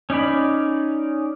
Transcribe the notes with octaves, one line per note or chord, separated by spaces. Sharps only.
C#4 D#4 D5 B5